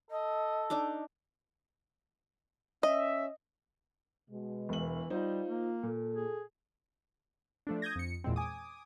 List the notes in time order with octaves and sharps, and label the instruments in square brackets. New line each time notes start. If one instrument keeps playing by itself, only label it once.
[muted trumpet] A4 [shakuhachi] D#5
[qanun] D4 D#4 D6
[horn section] C#4 E5 [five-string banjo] D#5
[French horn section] B2 G#3
[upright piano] E1 F#7 [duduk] E3
[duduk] G3 [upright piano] D#4 C5 [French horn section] F4
[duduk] A#3
[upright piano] A#2 [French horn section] A4
[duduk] G#4
[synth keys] F3 A3 D4
D#6 G6 G#6 A#6
F2 C#7
E2 A#2 G#3 C4
G#5 D6 D#6